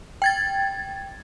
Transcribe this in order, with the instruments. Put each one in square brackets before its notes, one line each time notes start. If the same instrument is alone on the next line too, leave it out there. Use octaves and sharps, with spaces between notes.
[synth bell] G5 G#6 A6